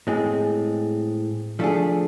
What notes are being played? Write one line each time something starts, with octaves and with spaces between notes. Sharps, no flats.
A2 G#3 C4 G#4
F3 A3 D4 G#4